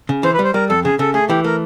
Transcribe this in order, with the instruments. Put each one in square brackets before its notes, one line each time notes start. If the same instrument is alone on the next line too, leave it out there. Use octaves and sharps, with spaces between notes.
[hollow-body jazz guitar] C#3
[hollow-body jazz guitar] E3 [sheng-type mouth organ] C5
[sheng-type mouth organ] B4
[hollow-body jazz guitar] G3 [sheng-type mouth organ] C5
[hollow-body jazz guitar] G3 [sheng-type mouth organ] A#4
[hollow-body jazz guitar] F2 [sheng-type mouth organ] A4
[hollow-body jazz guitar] C#3 [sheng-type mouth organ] G#4
[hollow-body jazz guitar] C#3 [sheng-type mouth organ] A4
[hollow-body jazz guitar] A3 [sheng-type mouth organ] G#4
[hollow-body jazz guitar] E3 [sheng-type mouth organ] G4
[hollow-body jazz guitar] A3 [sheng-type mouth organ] A#4